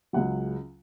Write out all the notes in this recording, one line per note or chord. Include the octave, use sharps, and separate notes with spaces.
C#2 C#3 F#3 F#5